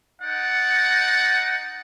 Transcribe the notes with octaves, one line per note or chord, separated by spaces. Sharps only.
D#4 D5 F#5